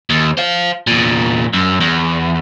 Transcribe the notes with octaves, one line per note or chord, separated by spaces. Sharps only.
D#2
C5 F5
E2 A#2
F#2
E2